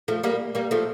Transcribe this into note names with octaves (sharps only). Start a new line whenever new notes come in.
F3 A3
G3 A#3
G3 A#3
F3 A3